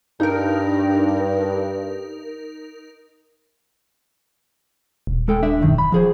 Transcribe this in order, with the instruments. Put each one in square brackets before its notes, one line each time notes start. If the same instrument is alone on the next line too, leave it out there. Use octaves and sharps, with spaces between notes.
[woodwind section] G2 [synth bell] D#4 A#4
[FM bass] D#1
[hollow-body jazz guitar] G#3 A4 G5
D4 E5
B1 F#2 D#3
B5
F3 G#4 C5